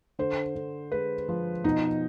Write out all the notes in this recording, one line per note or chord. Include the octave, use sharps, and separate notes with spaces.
D3 C5
D3
G#3 B4
F3
B2 D#4